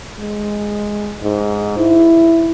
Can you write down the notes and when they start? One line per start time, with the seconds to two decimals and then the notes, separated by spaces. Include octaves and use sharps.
0.19 G#3
1.22 G#2
1.78 E4